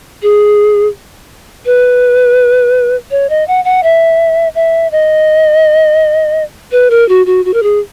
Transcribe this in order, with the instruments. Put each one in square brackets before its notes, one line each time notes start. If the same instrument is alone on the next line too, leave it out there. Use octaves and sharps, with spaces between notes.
[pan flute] G#4
B4
C#5
D#5
F#5
F#5
E5
E5
D#5
B4
A#4
F#4
F#4
F#4
A#4
G#4